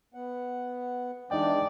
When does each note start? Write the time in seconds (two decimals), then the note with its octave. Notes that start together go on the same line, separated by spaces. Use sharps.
0.14 B3 F#5
1.31 E3 G#3 D4 D#4 D5 D#5 G5